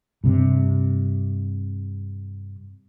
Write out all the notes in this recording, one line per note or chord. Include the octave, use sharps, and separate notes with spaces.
G2 C3